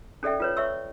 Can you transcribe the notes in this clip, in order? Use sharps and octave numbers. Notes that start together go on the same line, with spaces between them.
C#4 A4 D5 E5 G5
F4 B4 C#5
C#5 E5 C#6 E6